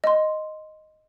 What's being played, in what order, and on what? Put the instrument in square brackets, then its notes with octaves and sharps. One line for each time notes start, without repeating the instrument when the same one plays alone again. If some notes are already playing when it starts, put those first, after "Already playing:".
[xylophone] D#5 C6